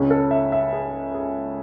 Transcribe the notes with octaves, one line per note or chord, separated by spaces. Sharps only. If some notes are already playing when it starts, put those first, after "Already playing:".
Already playing: C#2 C#3 G#3 C#4
A4
E5
E5
G#4
G#4